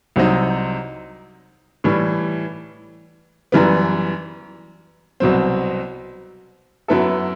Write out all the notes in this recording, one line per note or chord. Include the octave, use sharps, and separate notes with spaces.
C2 C3 F#3 C4 D#4
A2 E3 G3
F#2 E3 G3 B3
C2 B2 F#3 C4
F#2 F#3 B3 E4 A4